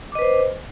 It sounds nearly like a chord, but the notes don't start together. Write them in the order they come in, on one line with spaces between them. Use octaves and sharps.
D6 D#5 B4 C5